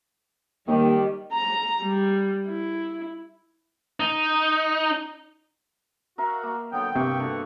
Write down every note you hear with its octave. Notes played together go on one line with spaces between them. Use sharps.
D#2 D#3 G3 G4
A#5
G3
E4
D#4
F#4 A#4 E5 F5
A#3
D3 F#3 B3 G5
G2 C3 A#3 B3 E5 C#6
D3 F#4 F#5